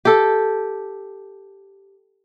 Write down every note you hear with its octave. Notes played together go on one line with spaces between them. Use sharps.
G4 A4